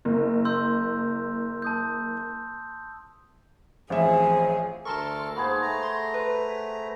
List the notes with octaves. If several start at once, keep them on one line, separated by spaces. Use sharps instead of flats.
F#1
C6 E6 G6
A5 D#6 G6
A1 F3 C4 G#4 E5
D2 A4 A#4 A5 C6 C#6
G#2 A#3 B3 G#4 C5
A3 A#5
C6
B4